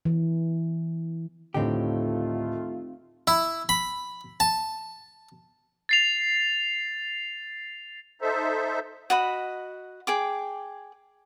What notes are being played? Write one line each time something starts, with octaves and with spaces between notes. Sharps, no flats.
E3
D2 A2 D#3 A3 C4 D#4 F4 G4
E4
B5
A5
A6 C7 F7
D#4 A4 C5 E5
F#4 D#5 B5
G#4 G5 D6